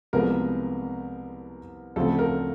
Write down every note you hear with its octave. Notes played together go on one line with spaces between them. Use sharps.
C2 C3 F3 G#3 B3 A#4
D2 C#3 F3 A3 C4 A4
A#4